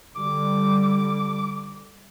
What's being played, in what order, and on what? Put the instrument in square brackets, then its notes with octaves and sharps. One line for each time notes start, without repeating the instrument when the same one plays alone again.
[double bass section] D3 G3 [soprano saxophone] D6